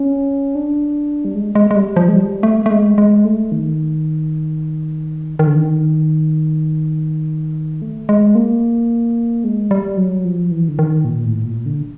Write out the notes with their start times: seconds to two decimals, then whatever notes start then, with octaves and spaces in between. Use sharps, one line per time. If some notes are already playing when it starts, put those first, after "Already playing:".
Already playing: C#4
0.55 D4
1.25 G3
1.35 G#3
1.55 G#3
1.71 G#3
1.76 G3
1.96 F3
2.09 G#3
2.16 G3
2.43 A3
2.66 A3
2.71 G#3
2.98 G#3
3.25 A3
3.52 D#3
5.39 D#3
5.47 D3
5.56 D#3
7.82 A3
8.09 G#3
8.35 A#3
9.44 G#3
9.71 G3
9.97 F#3
10.25 F3
10.51 E3
10.68 D3
10.79 D#3
11.04 A#2
11.25 A2
11.45 A#2
11.66 D3